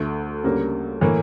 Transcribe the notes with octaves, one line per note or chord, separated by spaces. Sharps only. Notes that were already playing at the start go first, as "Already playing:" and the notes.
Already playing: D2 D3 A3
D2 C#3 G3 A#3
A2 E3 A#3